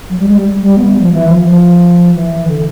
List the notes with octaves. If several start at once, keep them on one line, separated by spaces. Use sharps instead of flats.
F#3
G3
G#3
G3
G3
B3
G3
F3
E3
F3
F3
E3
D3